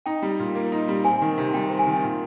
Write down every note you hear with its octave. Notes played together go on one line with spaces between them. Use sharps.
D#4 G5
G3
A#2
A#3
D#4
G3
C4 G#5
D#3
C3
G3 G5
C4
G#5
D#3
A#2